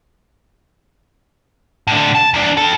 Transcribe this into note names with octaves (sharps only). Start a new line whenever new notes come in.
A2 D3
A5
E2 D4
F2 A4